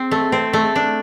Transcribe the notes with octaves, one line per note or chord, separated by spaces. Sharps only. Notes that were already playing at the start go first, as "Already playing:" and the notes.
Already playing: C4
A3
C4
A3
D4